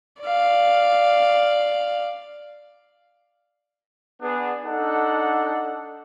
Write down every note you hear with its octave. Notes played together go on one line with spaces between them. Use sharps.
D5 F5
B3 D4 G#4
D4 D#4 A4 F#5